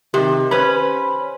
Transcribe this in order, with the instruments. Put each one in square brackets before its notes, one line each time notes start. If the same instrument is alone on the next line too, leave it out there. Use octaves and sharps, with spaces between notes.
[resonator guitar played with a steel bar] C3 [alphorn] D#3 [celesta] G4
[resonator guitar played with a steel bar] C#4 B4 [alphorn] C5 [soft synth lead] B5